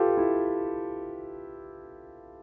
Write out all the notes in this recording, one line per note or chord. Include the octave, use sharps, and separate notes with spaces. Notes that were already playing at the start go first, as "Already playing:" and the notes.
Already playing: F4 G4 A4 B4
E4